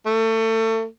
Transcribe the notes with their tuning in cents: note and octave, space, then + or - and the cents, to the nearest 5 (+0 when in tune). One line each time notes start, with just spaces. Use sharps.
A3 +30